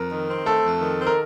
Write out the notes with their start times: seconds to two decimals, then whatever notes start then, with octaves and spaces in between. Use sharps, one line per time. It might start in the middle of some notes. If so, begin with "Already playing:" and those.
Already playing: F2 A#4
0.11 D#3
0.29 C4
0.46 A3 A4
0.63 F2
0.81 D#3
0.98 C4
1.07 A#4